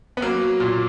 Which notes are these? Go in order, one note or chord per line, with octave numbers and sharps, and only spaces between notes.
B3
F#3 A#3
F#3
A#2